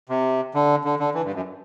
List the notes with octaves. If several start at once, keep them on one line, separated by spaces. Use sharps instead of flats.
C3
D3
D3
D3
E3
G2
F#2